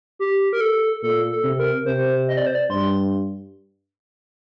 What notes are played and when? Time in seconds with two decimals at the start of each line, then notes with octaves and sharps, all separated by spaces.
0.19 G4
0.53 A#4
0.61 A4
1.02 A#2 A4
1.31 A4
1.44 C3
1.58 A#4
1.86 C3 C5
2.28 D#5
2.37 D5
2.47 C5
2.55 D5
2.69 G2 C6